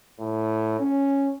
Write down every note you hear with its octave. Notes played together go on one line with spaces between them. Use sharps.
A2
C#4